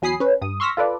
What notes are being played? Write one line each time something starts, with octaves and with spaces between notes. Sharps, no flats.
E2 F#3 G#5 B5 D#6 C7
C#4 B4
G2 D#6
C6 C#6 E6 F6 A#6 B6
F4 A4 B4 D5